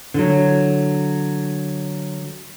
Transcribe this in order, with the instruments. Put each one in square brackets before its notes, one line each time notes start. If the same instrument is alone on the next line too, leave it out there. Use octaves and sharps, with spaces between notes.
[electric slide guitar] D3 F#3